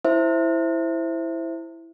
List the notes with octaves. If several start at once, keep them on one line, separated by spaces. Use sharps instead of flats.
E4 C5 E5